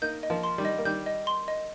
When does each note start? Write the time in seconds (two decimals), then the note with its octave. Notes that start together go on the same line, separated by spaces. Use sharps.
0.02 A#3 D#4 G6
0.23 D#5
0.30 F3 A#3
0.43 C6
0.58 D#3 G3
0.65 D#5
0.78 A#3
0.85 D#3 G3 G6
1.06 D#5
1.27 C6
1.48 D#5